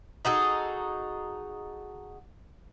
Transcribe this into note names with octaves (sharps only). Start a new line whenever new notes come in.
D#4 F#4 G#4 A4